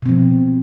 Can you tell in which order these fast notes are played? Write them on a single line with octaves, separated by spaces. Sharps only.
B2 C4 F3